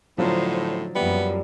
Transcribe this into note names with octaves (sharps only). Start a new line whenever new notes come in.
A2 D3 F3 F#3 D#4 C5
F#2 F3 G3 A#3 B3 E5